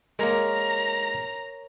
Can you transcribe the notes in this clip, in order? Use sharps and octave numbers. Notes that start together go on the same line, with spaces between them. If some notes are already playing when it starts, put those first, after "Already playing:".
G#3 A#3 A#4 C#5 A#5